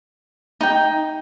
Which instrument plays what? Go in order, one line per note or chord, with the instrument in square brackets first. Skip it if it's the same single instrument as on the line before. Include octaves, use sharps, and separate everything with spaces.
[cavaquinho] D#4 G5